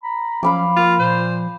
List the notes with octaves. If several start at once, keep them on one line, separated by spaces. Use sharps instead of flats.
A#5 B5
F3 F#3 C#4 F5 B5 D6
A#3 F4 A#4
A#2 C5